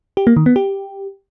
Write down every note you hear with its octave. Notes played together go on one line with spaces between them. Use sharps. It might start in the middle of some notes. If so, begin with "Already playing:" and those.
G4
A#3
D#3
B3
G4